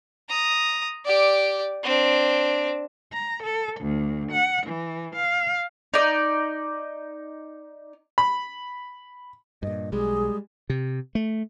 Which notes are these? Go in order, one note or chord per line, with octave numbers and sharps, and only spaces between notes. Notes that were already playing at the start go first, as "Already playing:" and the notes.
A#5 D#6
G4 D5
C4 D4
A#5
A4
D2
F#5
E3
F5
D#4 D5
B5
G2 A#2 D#5
B1 G3 G#3 G#4
C3
A3